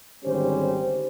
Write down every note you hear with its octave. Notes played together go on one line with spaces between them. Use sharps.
G#1 D3 G3 C#4 G4 C5